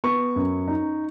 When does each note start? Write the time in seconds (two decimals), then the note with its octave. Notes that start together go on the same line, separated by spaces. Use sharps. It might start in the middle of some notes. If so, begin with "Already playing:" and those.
0.04 B3 C#6
0.36 F#2
0.68 D#4